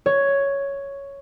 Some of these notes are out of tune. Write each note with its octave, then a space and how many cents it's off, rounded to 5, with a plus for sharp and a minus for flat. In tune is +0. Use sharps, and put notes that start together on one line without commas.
C#5 +5